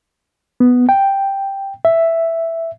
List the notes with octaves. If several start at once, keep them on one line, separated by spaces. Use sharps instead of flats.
B3
G5
E5